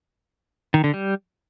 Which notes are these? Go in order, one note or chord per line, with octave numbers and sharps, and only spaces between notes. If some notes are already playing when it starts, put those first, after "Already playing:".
D#3
D3
G3